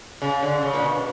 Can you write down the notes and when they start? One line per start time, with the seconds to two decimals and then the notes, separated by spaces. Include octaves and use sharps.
0.22 C#3
0.42 D3
0.63 C#3
0.74 A#2
0.83 B2